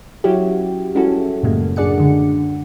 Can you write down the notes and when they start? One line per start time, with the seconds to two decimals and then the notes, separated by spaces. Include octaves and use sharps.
0.24 F#3 C#4 E4 F#4 G4
0.95 G3 G#3 C#4 E4 F#4 A4
1.43 F#2 A2 C#3 G3 G#3 A#3
1.76 F#2 D4 G#4 D5 F#5 C#7
1.98 D3 G#3